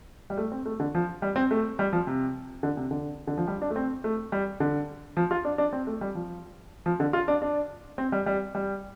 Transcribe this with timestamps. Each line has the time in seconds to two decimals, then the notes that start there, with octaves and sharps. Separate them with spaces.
0.30 G3
0.38 A3
0.52 C4
0.66 A3
0.80 D3
0.95 F3
1.22 G3
1.36 C4
1.51 A3
1.79 G3
1.93 F3
2.07 C3
2.63 D3
2.77 C3
2.91 D3
3.27 D3
3.37 F3
3.47 G3
3.62 D4
3.70 A3
3.76 C4
4.04 A3
4.32 G3
4.60 D3
5.17 F3
5.31 F4
5.45 D4
5.58 D4
5.73 C4
5.87 A3
6.01 G3
6.15 F3
6.86 F3
7.00 D3
7.13 F4
7.28 D4
7.42 D4
7.98 C4
8.12 G3
8.26 G3
8.55 G3